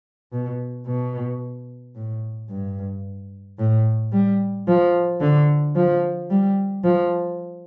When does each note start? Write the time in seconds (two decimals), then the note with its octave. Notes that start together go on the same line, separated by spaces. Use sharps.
0.32 B2
0.87 B2
1.96 A2
2.50 G2
3.59 A2
4.13 G3
4.68 F3
5.21 D3
5.76 F3
6.31 G3
6.84 F3